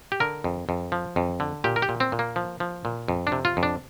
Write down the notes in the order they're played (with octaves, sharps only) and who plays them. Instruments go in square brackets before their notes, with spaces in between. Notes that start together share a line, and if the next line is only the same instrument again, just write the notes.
[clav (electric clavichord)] G4
D3 A#4
F2
F2
F3
F2
D3
A#2 G4
A#4
G4
A#2
C4
A#2
A#3
F3
F3
A#2
F2
D4
C3
F4
F2
D4